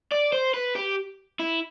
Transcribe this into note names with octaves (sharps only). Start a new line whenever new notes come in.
D5
C5
B4
G4
E4